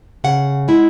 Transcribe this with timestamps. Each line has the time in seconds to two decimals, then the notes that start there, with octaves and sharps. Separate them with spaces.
0.24 C#3 F#5
0.68 G#3 E4